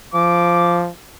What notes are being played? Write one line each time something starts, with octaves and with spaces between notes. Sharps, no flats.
F3 D6